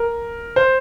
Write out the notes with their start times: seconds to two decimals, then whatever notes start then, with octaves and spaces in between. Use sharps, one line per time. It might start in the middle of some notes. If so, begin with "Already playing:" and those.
Already playing: A#4
0.56 C5